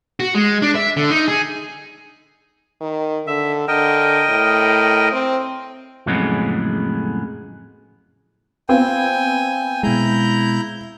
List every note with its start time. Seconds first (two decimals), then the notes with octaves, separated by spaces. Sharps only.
0.20 F#4
0.35 G#3
0.62 D4
0.75 E5
0.97 D3
1.10 D#4
1.28 G#4
2.81 D#3
3.27 D3 E5
3.68 D3 A#4 D#5 G5
4.30 A2
5.13 C4
6.06 F2 A2 C#3 F#3 G#3 B3
8.69 B3 C4 F4 G5 G#5
9.83 B2 G#3 E4 A#5 G6